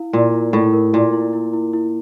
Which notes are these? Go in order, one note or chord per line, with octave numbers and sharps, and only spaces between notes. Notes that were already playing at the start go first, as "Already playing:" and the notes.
Already playing: E4 F5
A#2 E4
E4
A2 E4
A#4
A#2 E4
E4
E4
E4
E4